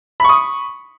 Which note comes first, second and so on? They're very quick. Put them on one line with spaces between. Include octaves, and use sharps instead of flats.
B5 C#6 D#6